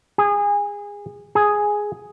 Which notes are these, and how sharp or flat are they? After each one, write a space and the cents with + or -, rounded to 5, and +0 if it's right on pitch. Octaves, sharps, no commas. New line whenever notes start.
G#4 -25
G#4 +0